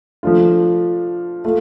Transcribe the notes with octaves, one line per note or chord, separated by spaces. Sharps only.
F3 A3 D4 F4
A3 F4